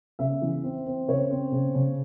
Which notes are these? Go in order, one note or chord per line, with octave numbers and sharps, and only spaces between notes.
C#3 E5
E3
C4
C4
C#3 C#5
C4
C#3
C#3